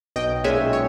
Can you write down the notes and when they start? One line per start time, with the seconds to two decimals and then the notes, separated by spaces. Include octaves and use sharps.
0.16 B1 D#5 G5
0.44 A#2 G#3 C#4 E5 G#5
0.73 C#5